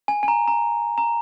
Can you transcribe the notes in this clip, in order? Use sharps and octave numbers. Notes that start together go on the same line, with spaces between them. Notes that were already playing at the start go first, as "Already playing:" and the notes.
G#5
G#5
A#5
A#5
A#5